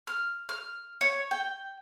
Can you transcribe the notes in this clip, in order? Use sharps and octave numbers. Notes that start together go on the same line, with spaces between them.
F6
F6
C#5
G5